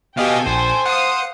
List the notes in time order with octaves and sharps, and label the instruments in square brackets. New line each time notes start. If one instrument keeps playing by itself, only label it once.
[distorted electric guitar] B2 [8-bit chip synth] G4 D#5 F5 [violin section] A4 G5 G#5
[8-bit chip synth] A#1 [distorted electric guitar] C5
[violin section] F5 D#6 [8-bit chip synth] F#5